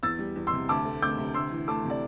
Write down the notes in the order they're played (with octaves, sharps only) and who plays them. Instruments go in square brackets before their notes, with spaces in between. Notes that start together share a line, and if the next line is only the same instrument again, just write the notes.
[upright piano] E2 E6 A6
G3
E2
C6 E6
C3
D2 A5 D6
A3
D2 D6 G6
C3
D2 C6 E6
E3
A3 A5 D6
C3 D5